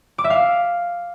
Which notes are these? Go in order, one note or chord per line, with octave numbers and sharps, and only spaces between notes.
D6
E5
F5